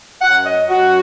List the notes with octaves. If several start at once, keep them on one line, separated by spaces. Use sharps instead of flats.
F#2 F#3 F#5
D#5
F#2 F#3 F#4